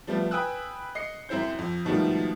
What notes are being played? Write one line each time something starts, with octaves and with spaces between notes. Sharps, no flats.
F3 G3 A3 B3
B4 G5 G#5 D#6 E6 F#6
D#5 C7 C#7
F#2 C4 E4 C5 G6
F2
G#2 B2 D#3 F3 G3 A3